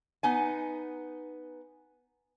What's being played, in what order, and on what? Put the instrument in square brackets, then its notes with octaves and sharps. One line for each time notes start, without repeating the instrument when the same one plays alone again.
[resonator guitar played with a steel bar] B3 D#4 G#5